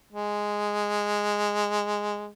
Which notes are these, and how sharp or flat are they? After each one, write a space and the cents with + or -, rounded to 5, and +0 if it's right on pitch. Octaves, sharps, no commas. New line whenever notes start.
G#3 -5